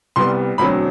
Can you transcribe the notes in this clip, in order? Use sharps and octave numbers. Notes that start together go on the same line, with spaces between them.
C2 C3 G3 B3 C6
E1 D2 D3 F#3 C4 B5